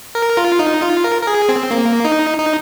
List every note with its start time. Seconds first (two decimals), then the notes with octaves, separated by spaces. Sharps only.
0.15 A#4
0.37 F4
0.59 D#4
0.82 F4
1.04 A#4
1.22 A#4
1.27 G#4
1.49 C4
1.71 A#3
2.05 D#4
2.39 D#4